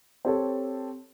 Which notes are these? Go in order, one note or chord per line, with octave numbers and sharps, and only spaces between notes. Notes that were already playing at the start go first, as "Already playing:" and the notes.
C4 G4 A4 C#5